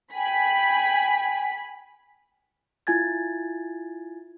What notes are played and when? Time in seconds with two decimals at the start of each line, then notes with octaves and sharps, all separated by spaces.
0.14 G5 G#5 B5 B6
2.87 E4 F4 G#5 G#6 A6